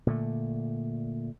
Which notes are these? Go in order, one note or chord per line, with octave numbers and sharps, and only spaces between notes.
A#2 D3 A3